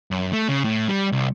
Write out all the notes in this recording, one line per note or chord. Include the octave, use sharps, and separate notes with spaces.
F#2
A3
C#3
A2
G3
C2